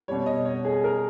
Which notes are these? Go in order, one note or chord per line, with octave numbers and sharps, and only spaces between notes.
B2 G3 C#5
D#5
C#5
G#4
A#4